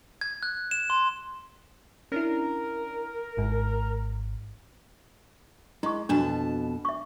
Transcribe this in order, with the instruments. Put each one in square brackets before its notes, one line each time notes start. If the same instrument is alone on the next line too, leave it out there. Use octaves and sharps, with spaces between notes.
[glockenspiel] G#6
F#6
E7
C6
[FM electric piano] C#4 D4 E4 [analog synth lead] A#4
[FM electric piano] G#1 G#2
[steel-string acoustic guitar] G#3 [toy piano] E4 C#6
[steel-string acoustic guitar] F2 B2 A5 [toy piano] D4 F#4
[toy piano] E5 C#6